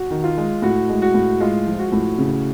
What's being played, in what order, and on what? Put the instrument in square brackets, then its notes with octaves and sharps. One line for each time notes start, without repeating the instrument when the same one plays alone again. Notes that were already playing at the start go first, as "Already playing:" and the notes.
Already playing: [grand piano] F#4
D#3
F4
G#3
A2 F#4
G#3
F#4
A2
G#3 F4
F3
F#4
A2
C#3